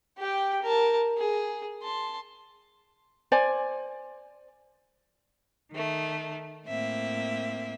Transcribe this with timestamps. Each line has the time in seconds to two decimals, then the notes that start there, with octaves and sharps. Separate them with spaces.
0.18 G4 G5
0.62 A#4 A5
1.17 G#4
1.83 A5 C6
3.32 C5 D5 G#5
5.72 D#3 A3
6.67 A2 A#3 C4 E5